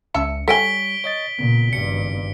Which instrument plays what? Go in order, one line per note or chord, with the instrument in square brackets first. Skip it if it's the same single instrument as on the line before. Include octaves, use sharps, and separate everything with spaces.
[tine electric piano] C#2 C#7 [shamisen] C#4 E5 A5
[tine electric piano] G3 C#5 [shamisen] A4 G5 G#5 [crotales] B6 D7 G7
[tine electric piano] C#5 D#5 A6
[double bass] A#2 [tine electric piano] C#3 B3
[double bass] G#1 G2 [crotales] C#7